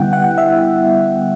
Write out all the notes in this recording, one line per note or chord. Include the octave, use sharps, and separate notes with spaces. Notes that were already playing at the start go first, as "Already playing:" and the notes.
Already playing: D3 G3 B3 E4 F#5 G5
F#5
E5